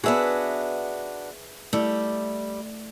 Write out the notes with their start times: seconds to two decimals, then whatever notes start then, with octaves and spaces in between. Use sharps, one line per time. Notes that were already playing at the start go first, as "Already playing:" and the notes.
0.03 B3 D4 F#4 G#4 B4 E5
1.73 G3 A3 E4